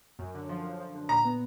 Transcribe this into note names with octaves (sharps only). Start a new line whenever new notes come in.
F#2
D3
F3
D3
F3
D3
A#2 A#5
B3